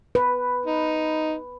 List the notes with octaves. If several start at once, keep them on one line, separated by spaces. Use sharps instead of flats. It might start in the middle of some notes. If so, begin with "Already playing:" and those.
B4
D#4